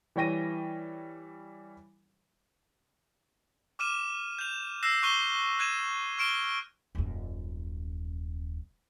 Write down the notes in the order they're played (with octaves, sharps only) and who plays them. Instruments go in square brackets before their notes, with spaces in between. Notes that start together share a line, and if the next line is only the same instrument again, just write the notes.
[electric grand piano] E3 G3 C#5 G5 A#6 D#7
[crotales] D6 F6 D#7 E7
G6 F7
E6 F#6 A#6 C7 E7
C#6 F#6 D#7 G7
F#6 G#6 D#7 E7
C#6 F6 D7 E7 G7
[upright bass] D#1 F#2